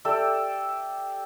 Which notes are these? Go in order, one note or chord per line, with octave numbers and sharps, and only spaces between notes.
G4 A4 D5 E5